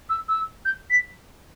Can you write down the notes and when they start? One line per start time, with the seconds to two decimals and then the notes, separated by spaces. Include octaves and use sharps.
0.09 E6
0.28 E6
0.65 G6
0.90 B6